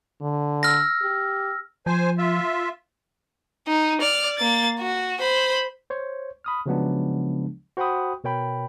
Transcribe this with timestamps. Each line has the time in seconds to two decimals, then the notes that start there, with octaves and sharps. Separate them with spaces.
0.21 D3
0.63 E6 F6 A#6
1.02 G4
1.86 F3 C5 G#5
2.18 F4 E5
3.68 D#4
4.01 D5 F6
4.39 A#3 A6
4.80 F#4
5.21 C5 B5
5.90 C5 C#5
6.44 B5 D#6 F6
6.66 C#3 F3 F#3 G#3 B3 D4
7.77 F#4 C5 F#5 G5 B5 D#6
8.24 B2 A#4 C#5 G5 B5